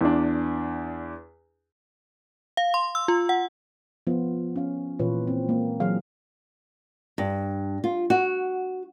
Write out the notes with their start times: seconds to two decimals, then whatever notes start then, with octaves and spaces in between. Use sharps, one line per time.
0.01 E2 D4
2.57 F5
2.74 C6
2.95 E6
3.08 F4
3.29 F#5
4.07 F3 B3 F4
4.56 C#4 F5
4.99 A#2 E3 F4 B4 C#5
5.27 C4
5.48 G#3 A#3
5.80 E3 F#3 G#4 F5
7.18 G2
7.84 F4
8.10 F#4